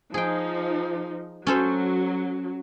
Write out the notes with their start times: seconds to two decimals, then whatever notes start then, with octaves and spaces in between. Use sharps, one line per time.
0.14 F3 D#4 G#4 G5
1.47 F#3 C#4 A4 C5